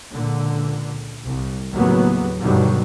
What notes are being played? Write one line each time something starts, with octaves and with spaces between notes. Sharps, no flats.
C#2 A#2 D3
C2
D#2 A2 C#3 F#3 A#3 B3
G2 B2 D3 D#3 F#3 G3